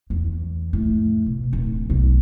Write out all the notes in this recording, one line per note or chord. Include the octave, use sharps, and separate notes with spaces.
E2
F2 A2
B2
D1
B1 D3